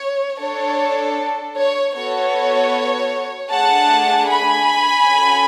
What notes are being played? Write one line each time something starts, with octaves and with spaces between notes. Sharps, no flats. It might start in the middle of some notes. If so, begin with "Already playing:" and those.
Already playing: C#5
D4 A4 C#5
C#5
B3 F#4 A4 C#5
A3 D4 G#4 F#5 A5
G#5 B5
C#4 F#4 A4